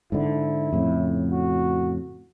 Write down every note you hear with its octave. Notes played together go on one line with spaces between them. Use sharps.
G#2 D3 E4
F2 A2 C#3
F#4